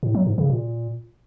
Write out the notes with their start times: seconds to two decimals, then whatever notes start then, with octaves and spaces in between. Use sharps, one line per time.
0.03 A2
0.15 F#3
0.26 G#2
0.38 C#3
0.50 A#2